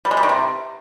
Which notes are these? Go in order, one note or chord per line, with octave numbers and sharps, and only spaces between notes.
G3
G#3
G3
D#3
C3